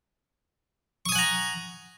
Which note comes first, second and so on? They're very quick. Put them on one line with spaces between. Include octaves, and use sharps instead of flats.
C#6 D#6 G#5 F#5 A#5